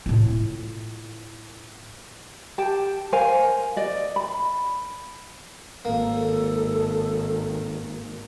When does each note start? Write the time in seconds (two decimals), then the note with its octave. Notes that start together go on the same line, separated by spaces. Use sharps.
0.06 A2 F4
2.58 G4 G5 A5
3.13 A#4 C5 F5 G#5
3.76 D5 D#5
4.16 B5
5.85 G#1 D#3 A#3 A4